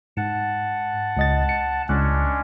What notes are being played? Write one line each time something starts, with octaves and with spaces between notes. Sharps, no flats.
G#2 F#5 A5
C#2 D#5 A6
C#7
C#2 G#3 C#4 D4 F#6